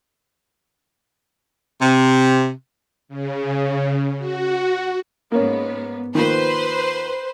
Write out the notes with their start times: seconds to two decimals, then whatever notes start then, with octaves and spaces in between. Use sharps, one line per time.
1.81 C3
3.08 C#3
4.18 F#4
5.32 G#2 A#3 B3 C#4
6.15 D#3 F3 A#3 B4 C5